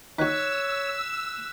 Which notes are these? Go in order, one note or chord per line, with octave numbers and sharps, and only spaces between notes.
D#3 F#4 C#5 E6 F#6 B6